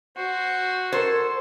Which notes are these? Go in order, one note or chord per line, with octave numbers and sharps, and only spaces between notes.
F#4 C5
A4 A#4 C5 G#6